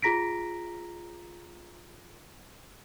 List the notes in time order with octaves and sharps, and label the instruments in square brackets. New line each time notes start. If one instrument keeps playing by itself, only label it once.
[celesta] F4 G#4 A#5 A#6 B6 D7